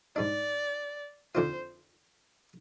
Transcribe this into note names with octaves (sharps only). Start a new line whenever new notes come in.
G#2 G3 D4 D5
F2 D3 F3 C4 F4 C5